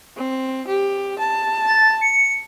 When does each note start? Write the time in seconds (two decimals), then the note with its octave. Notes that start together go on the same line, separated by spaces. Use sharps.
0.17 C4
0.67 G4
1.19 A5
1.66 A6
2.01 C#7